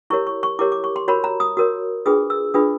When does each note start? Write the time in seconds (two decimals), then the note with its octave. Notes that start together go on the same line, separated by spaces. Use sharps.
0.10 E4 G4 A#4 C#5 C#6
0.27 C#6
0.43 C#6
0.59 E4 G4 A#4 C#5 D6
0.72 D6
0.84 C#6
0.96 C6
1.08 F#4 A#4 C#5 B5
1.24 A#5
1.40 D#6
1.57 F#4 A#4 C#5 D#6
2.06 D4 F4 G#4 B4 D#6
2.30 E6
2.54 D4 F4 G#4 B4 D#6